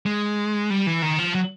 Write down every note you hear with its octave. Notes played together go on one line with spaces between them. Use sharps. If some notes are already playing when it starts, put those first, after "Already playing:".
G#3
G3
E3
D#3
F3
F#3